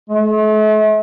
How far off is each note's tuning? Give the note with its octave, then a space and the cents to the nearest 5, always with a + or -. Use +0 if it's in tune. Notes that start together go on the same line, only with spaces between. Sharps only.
A3 -40